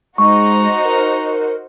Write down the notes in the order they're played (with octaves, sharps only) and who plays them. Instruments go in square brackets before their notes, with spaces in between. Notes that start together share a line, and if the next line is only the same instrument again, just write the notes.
[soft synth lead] G#3 [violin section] D#4 F#4 C5 [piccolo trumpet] A#5 [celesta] C#6
[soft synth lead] A#4